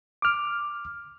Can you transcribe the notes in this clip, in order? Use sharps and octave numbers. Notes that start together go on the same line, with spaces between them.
D6 F6